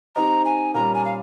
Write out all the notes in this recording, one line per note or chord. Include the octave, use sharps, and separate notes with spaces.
C4 D#4 G4 C5 D#5 A#5
G#5
A#2 G3 C#4 A#5
G#5
F5